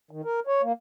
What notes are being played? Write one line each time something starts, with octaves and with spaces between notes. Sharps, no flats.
D#3
A#4
C#5
A#3